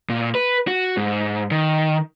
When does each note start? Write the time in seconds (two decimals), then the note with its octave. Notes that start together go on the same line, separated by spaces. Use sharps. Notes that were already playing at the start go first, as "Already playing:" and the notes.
0.09 A#2
0.35 B4
0.68 F#4
0.97 G#2
1.51 D#3